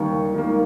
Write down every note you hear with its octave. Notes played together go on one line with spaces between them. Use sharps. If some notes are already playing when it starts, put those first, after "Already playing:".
Already playing: D#2 D#3 G3 A#3 C#6
D#2
D#3 G3 A#3